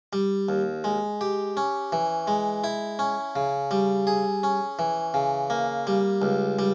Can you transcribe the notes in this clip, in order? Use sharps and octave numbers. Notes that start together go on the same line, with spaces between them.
G3
D#2
G#3
G4
C#4
E3
G#3
E4
C#4
C#3
G3
G#4
C#4
E3
C#3
A#3
G3
C#2
G3